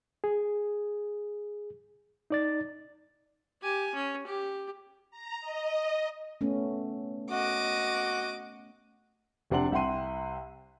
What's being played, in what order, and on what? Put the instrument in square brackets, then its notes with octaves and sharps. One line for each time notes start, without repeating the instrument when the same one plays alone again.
[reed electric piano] G#4
D#4 D5 A6
[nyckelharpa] G4 G#5
C#4
G4
[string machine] A#5
D#5
[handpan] A3 B3 C#4
[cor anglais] F#4 [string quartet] D#5 D6
[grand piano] F1 C3 D4 F#5 C6 F#7
C2 E5 F#5 G5 C6 D#7